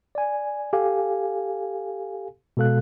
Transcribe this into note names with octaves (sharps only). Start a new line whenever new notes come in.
D5 G#5
G4 A4 F5 G#5
B2 G#3 A4 F5 F#6